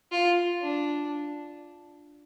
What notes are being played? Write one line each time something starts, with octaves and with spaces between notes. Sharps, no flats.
F4
D4